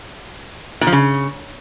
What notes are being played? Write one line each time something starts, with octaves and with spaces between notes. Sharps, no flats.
A#2
F3
C#3